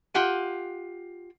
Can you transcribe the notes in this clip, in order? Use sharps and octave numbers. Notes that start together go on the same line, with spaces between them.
F4 G4 F#5 G#5